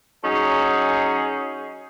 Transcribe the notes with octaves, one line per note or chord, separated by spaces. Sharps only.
F#3 C#4 D#4 G#4